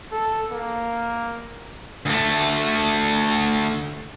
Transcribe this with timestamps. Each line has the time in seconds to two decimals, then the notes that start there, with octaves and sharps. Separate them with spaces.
0.12 A4
0.52 A#3
2.06 D2 A3